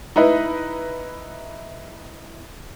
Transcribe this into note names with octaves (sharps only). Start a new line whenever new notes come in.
D#4 E4 B4 D#5